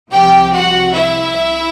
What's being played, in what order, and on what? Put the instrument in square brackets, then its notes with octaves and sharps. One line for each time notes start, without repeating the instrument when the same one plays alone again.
[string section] C2 C3 F3 G4 G5
F#4 F#5
E4 E5